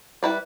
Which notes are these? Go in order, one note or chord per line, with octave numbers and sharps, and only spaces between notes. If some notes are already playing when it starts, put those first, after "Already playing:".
G3 E4 B4 D5